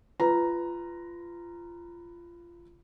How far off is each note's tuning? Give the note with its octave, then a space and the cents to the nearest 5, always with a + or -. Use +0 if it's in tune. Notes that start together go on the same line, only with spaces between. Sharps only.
F4 -20 B4 +10 A#5 +0